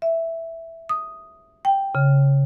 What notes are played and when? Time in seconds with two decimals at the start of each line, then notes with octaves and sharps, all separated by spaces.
0.02 E5
0.89 D#6
1.65 G5
1.95 C#3